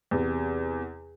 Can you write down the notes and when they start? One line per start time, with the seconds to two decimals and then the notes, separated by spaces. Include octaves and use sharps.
0.11 E2 C3